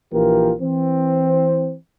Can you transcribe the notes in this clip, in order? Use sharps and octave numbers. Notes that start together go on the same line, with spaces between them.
A#1 E3 A#3 F4 G4 A#4
E3 C4